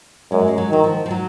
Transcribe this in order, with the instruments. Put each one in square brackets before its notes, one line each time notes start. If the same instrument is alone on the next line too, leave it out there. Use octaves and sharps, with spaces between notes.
[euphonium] F#2 [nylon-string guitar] G#3
[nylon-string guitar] F#3
G#3
F#3
[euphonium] D#3 [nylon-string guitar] F#3
[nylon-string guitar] F3
F3
F#3